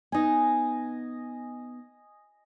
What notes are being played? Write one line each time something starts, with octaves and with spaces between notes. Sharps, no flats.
B3 D#4 D#5 G#5